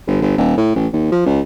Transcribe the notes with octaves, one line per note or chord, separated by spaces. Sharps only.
G1
G1
D#1
A2
A1
D#2
F3
C#2